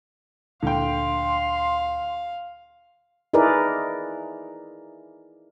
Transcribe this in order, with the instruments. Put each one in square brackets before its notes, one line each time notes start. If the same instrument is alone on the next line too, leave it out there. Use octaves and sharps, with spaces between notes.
[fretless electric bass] D2 A#2 [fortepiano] D3 G5 [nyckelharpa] F5 [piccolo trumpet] C6
[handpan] D#4 E4 G#4 A#4 B4 D5